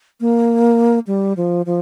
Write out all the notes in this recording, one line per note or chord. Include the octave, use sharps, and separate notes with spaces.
A#3
G3
F3
F3